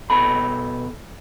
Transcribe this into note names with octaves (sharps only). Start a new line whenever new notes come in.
B2 A4 B5